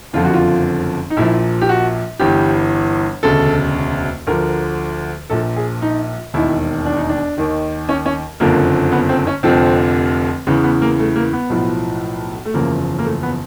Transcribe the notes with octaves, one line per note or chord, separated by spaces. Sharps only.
F#1 F2 D3 F3 F4
F#4
F4
D#4
A#1 A#2 F3 E4
G4
F#4
G1 G2 E3 G4
E1 D2 C#3 A4
D2 D3 F3 A#4
A#1 A#2 F3 A4
G#4
D#4
E1 D#2 D#3 E4
D4
D#4
D4
D#2 D#3
C#4
C#4
F#1 F2 D3 F3 A#3
B3
C4
C#4
F1 F2 D3 F3 C4
E2 C#3 E3 B3
B3
A#3
A3
A#3
B3
B1 A2 F3
A3
F#1 E2 C#3 F3 A#3
A#3
A3
B3